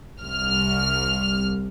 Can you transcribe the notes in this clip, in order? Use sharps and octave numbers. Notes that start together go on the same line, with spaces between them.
C2 F6